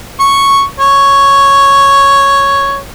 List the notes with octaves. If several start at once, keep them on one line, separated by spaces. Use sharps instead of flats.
C#6
C#5